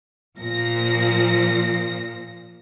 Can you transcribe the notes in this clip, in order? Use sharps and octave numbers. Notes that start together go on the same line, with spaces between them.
A#2 F3 A#6